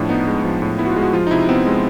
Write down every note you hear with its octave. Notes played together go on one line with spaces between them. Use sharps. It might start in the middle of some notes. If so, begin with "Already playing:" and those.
Already playing: A2 F3 D4
B3 D#4
G#3
F3
A2
B3 E4
F#4
F4
G#3
F#4
F3 F4
D#4
C3 E4
B3 C4
G#3